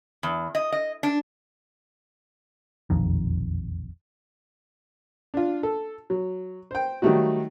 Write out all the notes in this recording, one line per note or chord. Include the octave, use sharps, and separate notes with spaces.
E2
D#5
D#5
D4
E1 A#1 F2 D#3
D4 F4
A4
F#3
C5 G5
D#3 F#3 G3 A3 D#4 F#4